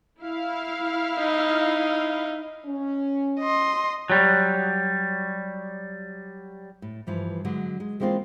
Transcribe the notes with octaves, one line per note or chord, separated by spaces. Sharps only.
E4 F5
D#4
C#4
D#5 C6
F#3 G3
A2
G2 E3 F3
D3 F#3 G#3
G#3
E3 G#3 A#3 C4 F4